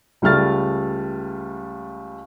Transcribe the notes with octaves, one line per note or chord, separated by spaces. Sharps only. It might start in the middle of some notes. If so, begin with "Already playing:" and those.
C#2 G3 A3 F6 A6